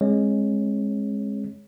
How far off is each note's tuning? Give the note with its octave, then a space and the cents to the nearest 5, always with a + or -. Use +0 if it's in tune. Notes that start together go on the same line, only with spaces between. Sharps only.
G#3 +0 C4 +45 C#5 +0